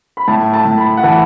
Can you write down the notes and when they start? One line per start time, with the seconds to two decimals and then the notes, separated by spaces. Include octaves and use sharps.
0.17 B5
0.28 A2 A5
0.53 A5
0.65 A2
0.78 B5
0.97 F#5
1.03 E3 A5